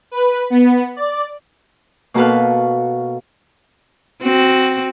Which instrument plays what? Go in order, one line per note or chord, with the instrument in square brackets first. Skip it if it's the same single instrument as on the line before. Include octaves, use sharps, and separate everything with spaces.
[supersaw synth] B4
B3
D5
[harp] B2 A#3 F#4 A4 B4 F5
[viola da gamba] C4 F#4